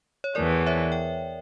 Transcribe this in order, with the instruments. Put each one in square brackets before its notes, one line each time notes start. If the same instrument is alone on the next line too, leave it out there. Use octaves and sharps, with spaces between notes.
[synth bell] C#5
[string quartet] E2 E3 A3 [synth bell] A#4 D5
[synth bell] C#5 E5
G5